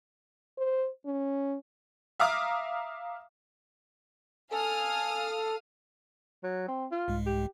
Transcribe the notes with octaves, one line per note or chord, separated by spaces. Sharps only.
C5
C#4
E5 F5 A#5 D6 D#6 F6
A4 F5 G#5 D#6 F6
F#3
C4
F4
C2 G#2 G#3
G4